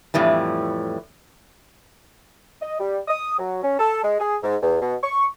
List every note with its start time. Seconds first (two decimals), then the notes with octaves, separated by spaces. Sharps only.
0.14 F2 A2 E3 G3
2.61 D#5
2.79 G3
3.08 D#6
3.38 F#3
3.63 C#4
3.79 A4
4.03 G#3
4.19 G#4
4.43 G#2
4.62 E2
4.81 B2
5.03 C#6